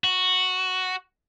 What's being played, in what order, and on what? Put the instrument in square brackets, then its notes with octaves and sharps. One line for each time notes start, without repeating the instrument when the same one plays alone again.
[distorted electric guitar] F#4